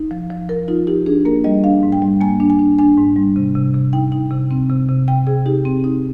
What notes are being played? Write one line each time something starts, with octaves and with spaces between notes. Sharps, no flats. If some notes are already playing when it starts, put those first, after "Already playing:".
Already playing: D#4
F3
F3
F3 A#4
D#4 F4
D#4 G4
D4 G#4
A#3 A#4
G3 D#5
D4 F5
G#2
G5
G3
A#3 G#5
D4
G#5
D4
D4 G#5
G#2
G3
C3
C3
C3
D#4 G5
D#4
C3
C4
C3
C3
C3 G5
C3 G#4
D#4 G4
C4
D#4